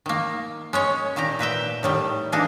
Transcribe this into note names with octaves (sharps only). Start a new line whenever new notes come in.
D#3 A#3
G#3 C#4 C#5
A#2 D#3 G4 A#5
A#2 B4 E5 G5
A2 D#3 G3
E3 A#3 D4 D#4